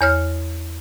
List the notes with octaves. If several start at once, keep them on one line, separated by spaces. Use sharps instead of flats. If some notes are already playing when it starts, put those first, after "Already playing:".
E2 C#5 F6